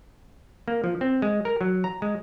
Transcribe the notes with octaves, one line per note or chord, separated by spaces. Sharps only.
A#3
F3
C4
G#3
A#4
F#3
A#5
G#3